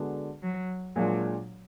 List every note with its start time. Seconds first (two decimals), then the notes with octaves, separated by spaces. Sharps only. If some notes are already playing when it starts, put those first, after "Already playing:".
Already playing: D3 G#3 B3 D4 F#4
0.42 F#3
0.96 A#2 F#3 G#3 D4 F4